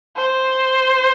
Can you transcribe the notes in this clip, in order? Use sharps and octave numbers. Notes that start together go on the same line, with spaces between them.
C5